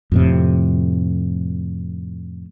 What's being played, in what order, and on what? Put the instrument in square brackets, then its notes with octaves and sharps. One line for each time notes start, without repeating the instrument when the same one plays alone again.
[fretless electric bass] F2 A2 C3